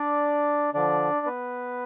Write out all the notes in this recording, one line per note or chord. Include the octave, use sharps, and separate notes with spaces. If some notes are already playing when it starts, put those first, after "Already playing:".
Already playing: D4 D5
D3 F3 D4 D5
B3 B4